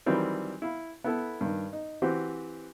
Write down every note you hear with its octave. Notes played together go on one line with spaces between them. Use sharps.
D#3 E3 F#3 G3 C4 E4
E4 F5
B3 E4 A4
G2 D#3
D#4
E3 C4 F#4 G4 C5